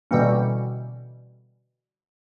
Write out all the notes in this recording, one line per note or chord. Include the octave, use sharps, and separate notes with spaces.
B2 D3 E3 G3 A#3 C#4